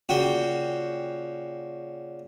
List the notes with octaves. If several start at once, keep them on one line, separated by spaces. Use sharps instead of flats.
A#2 C#3 F#4 G5